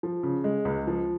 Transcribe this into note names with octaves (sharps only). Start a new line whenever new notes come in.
F3
C#3
G#3
C#2
F3